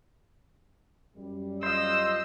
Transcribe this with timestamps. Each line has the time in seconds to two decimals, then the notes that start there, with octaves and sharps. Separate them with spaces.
1.16 F#2 G3
1.63 F4 C5 D#5 E6